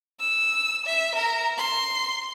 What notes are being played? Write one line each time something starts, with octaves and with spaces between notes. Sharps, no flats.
E6
E5
A#4 A#5
C6